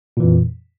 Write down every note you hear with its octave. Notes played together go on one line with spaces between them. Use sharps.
F2 A#2 E3